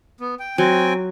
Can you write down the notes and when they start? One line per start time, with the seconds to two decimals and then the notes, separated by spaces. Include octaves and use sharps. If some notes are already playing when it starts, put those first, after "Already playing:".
0.20 B3
0.39 G5
0.58 F#3 C4 G5 G#5